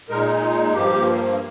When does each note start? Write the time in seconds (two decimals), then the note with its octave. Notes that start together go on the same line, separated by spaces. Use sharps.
0.10 A#2 G#3 D#4 A#4
0.74 G2 F3 A#3 G4